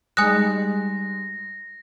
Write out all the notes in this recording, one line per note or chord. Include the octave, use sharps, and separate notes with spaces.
G3 G#3 D#4 G#5 D#6 F#6 A#6